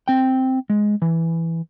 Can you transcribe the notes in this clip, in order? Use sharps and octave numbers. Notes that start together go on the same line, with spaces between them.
C4 G5
G#3
E3